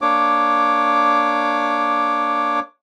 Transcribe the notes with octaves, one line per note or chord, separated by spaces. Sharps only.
A#3 D4 C#5 D6